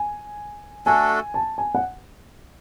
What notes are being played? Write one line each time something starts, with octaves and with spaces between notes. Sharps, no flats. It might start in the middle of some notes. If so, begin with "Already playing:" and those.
Already playing: G#5
A3 D4 F#4 A4 G#5
A5
G#5
F#5